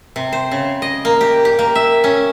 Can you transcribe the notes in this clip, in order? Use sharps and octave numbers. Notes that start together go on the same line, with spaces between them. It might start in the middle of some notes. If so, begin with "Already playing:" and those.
C3
C5
C#3
D#5
A#3
G4
G4
A#3
E5
C#4